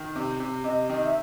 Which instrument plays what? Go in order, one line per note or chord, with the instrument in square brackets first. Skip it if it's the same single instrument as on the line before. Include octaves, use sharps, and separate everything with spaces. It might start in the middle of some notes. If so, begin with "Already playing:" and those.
Already playing: [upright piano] D#3
C3
C3
[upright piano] C3 [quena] D#5
[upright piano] D#3 [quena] D#5
[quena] E5